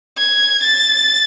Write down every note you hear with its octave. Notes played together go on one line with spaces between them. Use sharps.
G#6
A6